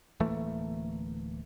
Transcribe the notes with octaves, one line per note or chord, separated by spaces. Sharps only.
D1 E3 A3 A#3